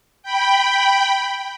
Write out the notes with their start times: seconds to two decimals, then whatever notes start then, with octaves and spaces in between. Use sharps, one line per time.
0.23 G5 B5